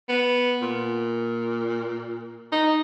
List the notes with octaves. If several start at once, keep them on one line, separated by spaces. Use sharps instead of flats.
B3
A#2
D#4